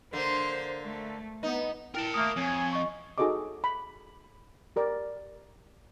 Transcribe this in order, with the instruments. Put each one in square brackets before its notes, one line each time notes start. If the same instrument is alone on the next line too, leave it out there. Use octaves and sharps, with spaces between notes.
[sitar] D3 A#3 [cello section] C5
[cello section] A3
[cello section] B3 [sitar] D#4
[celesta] E4 G5 [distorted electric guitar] A#4 A5
[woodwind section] A3 A#3 [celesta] D#6
[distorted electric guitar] F2 [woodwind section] C#5 G#5
[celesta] D#5 C#6
[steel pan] D#4 F#4 G#4 A4 D#5 D6
B5
G4 A#4 D5